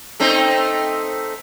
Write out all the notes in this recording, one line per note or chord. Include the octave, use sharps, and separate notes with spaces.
A3 C4 D#4